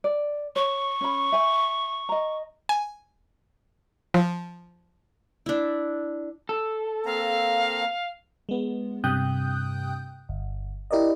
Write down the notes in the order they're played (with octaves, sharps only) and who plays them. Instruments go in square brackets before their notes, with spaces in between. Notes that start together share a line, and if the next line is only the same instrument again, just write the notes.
[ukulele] D5
[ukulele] C#5 [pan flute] C#6
[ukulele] C#4 B5
E5 G#5
D#5 A#5
[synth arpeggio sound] G#5
F3
[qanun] D4 E4
[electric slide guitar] A4
[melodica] A#3 C4 A#5 [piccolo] F5
[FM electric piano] G#3 B3
G2 C3 G5 D#6 F#6 G6
G1
E4 G4 A#4 D5 D#5